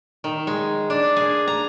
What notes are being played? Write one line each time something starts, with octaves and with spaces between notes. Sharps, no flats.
D#3
G#3
D4
G#4
A#5